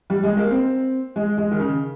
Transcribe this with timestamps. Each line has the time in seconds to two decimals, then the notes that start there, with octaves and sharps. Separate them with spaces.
0.10 G3
0.23 G#3
0.37 A#3
0.51 C4
1.16 G#3
1.37 G#3
1.51 D#3
1.59 C#3